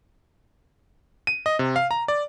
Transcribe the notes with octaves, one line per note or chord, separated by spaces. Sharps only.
D#7
D#5
C3
F5
A#5
D5